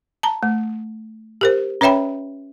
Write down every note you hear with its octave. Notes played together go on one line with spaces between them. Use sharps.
A5 A#5
A3
G4 A#4 C5
C#4 B4 C#5 E5 G5 B5